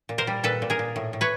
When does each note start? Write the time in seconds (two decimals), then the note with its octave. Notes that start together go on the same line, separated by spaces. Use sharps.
0.09 A#2
0.18 A#4 C5
0.27 G3
0.43 A#2 A4 B4
0.62 A#2
0.70 G#4 A#4
0.79 A#2
0.96 A2
1.13 A2
1.21 B4 C#5